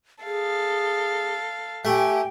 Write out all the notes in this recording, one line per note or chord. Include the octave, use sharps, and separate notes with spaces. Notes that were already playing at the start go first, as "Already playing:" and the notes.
G#4 A4 F5
A3 G4 G5 G#5